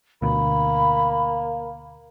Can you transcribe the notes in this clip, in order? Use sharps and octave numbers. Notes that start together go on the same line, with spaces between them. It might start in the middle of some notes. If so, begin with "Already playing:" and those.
D2 B2 A#3 B5